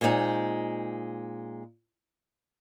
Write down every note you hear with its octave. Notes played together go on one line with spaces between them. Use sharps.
A#2 G#3 C4 C#4 D#4